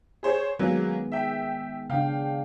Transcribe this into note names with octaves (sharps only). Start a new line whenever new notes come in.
G#4 C5 C#5
D#3 F#3 G#3 A#3 B3 C#4
E5 G5
C#3 D4 F5 G5